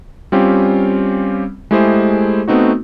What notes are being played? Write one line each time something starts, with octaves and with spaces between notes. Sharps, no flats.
G3 C4 C#4 F4 G4
G#3 A3 E4 G4 G#4 C5
A3 B3 C4 D#4 F#4